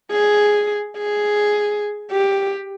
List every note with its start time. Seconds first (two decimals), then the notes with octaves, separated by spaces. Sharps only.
0.12 G#4
0.98 G#4
2.11 G4